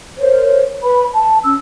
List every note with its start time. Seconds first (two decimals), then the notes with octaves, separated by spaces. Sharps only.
0.19 A#4 C5 C#5
0.83 B4 B5
1.13 A5
1.44 C#4 E6